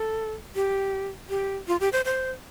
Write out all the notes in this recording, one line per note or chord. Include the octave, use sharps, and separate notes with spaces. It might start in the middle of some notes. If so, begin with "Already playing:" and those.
Already playing: A4
G4
G4
F4
G4
C5
C5